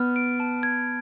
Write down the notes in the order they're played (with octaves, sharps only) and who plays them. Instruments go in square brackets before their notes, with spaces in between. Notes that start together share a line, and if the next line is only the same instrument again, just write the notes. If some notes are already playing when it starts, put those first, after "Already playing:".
Already playing: [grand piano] B3 [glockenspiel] F6
[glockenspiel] D7
A5
G#6